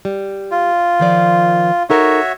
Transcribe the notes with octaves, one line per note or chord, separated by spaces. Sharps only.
G3
F4
D#3 F3 D5
D#4 F#4 A4 A#4 C#5 E5